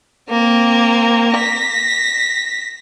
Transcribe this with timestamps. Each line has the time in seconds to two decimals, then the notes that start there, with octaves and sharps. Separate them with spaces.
0.30 A#3 C4
1.34 A#6 B6